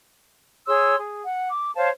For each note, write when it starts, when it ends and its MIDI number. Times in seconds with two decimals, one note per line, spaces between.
0.66 0.96 68
0.66 0.96 73
0.66 0.96 84
0.66 0.96 88
0.97 1.23 68
1.23 1.49 78
1.49 1.73 86
1.75 1.89 72
1.75 1.89 73
1.75 1.89 77
1.75 1.89 81